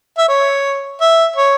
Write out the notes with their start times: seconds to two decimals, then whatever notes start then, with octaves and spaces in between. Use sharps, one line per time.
0.18 E5
0.28 C#5
1.01 E5
1.36 C#5